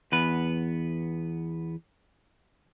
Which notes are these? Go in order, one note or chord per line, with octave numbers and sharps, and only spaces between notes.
E2 B3 B4